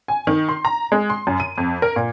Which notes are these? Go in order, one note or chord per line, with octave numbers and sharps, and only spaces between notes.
G#5
D#3
C6
A#5
G#3
C6
F#2
D#7
F2
A#4
A#2